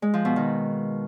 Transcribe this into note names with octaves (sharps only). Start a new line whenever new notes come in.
G#3
F3
B2
D#3